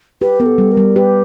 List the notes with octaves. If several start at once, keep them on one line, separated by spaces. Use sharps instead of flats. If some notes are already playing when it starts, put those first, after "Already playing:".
G4 B4
B3 A#4
A4
G3
A#4
G3
G4 B4